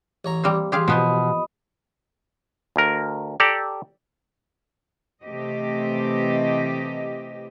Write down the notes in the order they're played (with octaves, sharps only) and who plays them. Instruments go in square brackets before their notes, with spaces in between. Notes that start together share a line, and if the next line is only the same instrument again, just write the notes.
[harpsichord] A1 C#5 A#5
[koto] G3 A#3 C4
[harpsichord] A1 [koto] G4 G#4 F5 [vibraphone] C6
[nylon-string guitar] B2 [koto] F3 B3 C5 [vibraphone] D#5 B5 D#6
[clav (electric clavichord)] D2 A#4
G4 A4 D5 A#5
[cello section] C3 E3 A3 C4 G4 D#5